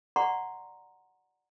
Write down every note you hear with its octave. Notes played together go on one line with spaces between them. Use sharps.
D5 F#5 A#5 C6 C#6